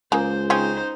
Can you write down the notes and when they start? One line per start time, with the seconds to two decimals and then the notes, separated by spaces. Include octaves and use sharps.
0.12 C#2 G#3 A#3 C5
0.50 C#3 C4 C#4 D#4 C5